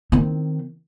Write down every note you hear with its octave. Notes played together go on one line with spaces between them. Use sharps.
D#3 C4